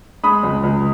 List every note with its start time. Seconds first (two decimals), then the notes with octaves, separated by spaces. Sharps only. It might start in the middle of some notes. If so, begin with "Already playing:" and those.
0.23 G#3 B5 D#6
0.43 C#2
0.63 C#2